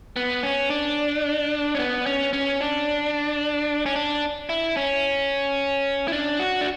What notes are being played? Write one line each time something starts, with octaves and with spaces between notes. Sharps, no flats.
B3
C#4
D4
C#4
B3
C#4
C#4
D4
C#4
D4
E4
C#4
E4
D4
F#4
D4